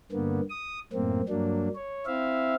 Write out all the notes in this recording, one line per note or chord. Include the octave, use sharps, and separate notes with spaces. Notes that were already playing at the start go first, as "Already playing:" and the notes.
G2 D3 A#3 B3
D#6
F#2 A2 A#3 C4
G2 F#3 A#3 D4
C#5
C4 E4 E5 F5